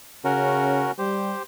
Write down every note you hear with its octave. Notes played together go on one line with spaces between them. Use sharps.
C#3 C#4 F#4 A#4
G3 G4 C5